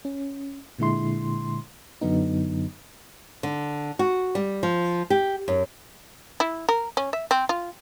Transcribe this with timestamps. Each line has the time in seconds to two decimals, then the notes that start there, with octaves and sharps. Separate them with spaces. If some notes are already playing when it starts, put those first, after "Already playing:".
0.05 C#4
0.79 A#2 D3 G#3 E4 C6
2.01 F#2 D3 F#3 B3 D#4
3.43 D3
3.99 F#4
4.35 G3
4.63 F3
5.10 G4
5.48 F#2
6.40 E4
6.69 A#4
6.97 C#4
7.13 E5
7.31 C4
7.49 F4